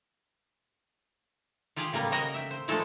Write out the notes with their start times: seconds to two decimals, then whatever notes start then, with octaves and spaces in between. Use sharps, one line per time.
1.76 F4 G4 G#4 F5
1.93 C#3 G3 A#3 B3
2.12 F#4 A#4 C#5 D#5 F#5
2.34 E5 G5
2.51 C5
2.68 A#2 F3 G#3 A3 F4 A4